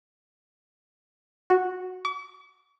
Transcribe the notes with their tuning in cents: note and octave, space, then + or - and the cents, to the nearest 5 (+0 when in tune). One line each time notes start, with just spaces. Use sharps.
F#4 -5
D6 -45